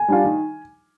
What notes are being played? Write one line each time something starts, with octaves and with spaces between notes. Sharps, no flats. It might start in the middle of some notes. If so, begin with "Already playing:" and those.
Already playing: G#5
G3 D4 F4
D#3